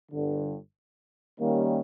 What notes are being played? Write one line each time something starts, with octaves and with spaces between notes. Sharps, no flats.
G1 G2 D3
D#2 D#3 G3 A#3 C#4